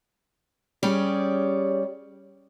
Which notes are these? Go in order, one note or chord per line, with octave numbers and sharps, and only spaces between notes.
G3 C#4 G4 G#4 C#5 D5